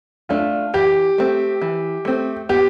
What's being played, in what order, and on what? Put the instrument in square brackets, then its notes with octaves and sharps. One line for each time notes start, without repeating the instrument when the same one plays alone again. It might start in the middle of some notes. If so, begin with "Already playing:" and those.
[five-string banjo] A3 D4 [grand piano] F4
[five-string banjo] E3 [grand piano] G4
[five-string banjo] A3 C4
E3
A3 C4
[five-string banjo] B3 [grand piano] G4